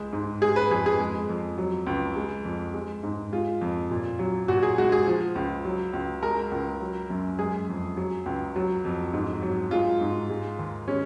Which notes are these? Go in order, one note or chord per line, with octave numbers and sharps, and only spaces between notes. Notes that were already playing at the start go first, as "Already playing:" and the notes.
Already playing: C#2 G#3
G#2
G#3 G#4
B4
F2 G#4
G#4
G#3
F2
F#3
C#2
G#3
F2
G#3
G#2
G#3 F4
F2
A#2
F#3
A#2 F#4
G#4
G#3 F#4
G#4
F3
C#2
F#3
C#2
G#3 A#4
C#2
F#3
F#2
G#3 G#4
F2
F#3
C#2
F#3
F2
G#2
F#3
G#3 F4
G#2
G#3
D#2
G#3 C#4